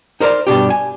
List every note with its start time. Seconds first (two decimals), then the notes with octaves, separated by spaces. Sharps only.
0.20 D#4 A#4 C5 D5 A#5
0.47 G2 B2 D4 G4
0.70 G#5